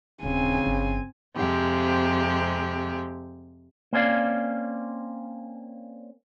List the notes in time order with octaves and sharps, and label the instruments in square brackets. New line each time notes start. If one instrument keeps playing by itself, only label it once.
[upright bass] D#1 [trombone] C#3 [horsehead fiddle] C4 G#5
[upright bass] G1
[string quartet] F2 C3 G#3 G4
[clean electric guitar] A#3 C4 C#4 D5 F5